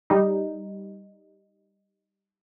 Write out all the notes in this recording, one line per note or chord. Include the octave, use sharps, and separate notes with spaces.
G3 D#4